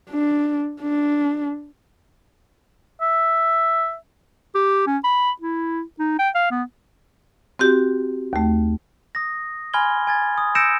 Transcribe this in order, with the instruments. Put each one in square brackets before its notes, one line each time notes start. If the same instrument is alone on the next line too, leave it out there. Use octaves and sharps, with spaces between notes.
[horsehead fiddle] D4
D4
[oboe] E5
[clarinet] G4
C#4
B5
E4
D#4
G5
F5
B3
[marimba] C4 F#4 G4
D#2 A3
[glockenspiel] D#6 A#6
G#5 B5 C6 F6 G#6 G7
G#5 G#6 A6
D#6
E6 G6 A#6 C#7 D7 E7